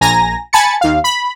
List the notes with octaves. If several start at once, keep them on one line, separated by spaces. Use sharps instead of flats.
A#1 G#5 A#5 A#6
G#5 A5 B5 A6 C#7
D#2 F5
B5